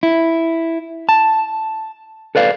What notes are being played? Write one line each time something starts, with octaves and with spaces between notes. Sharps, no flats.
E4
A5
A4 B4 D5 F5